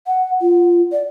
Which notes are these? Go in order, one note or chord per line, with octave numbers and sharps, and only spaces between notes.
F#5
F4
D5